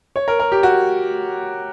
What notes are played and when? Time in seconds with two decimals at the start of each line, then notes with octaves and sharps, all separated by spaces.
0.16 C#5
0.28 A#4
0.40 A#4
0.52 G4
0.63 F#4